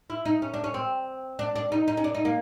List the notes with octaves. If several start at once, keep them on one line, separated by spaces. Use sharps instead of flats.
E4
D#4
C#4
D4
C#4
C4
D4
D4
D#4
D#4
C#4
D4
D#4
A#3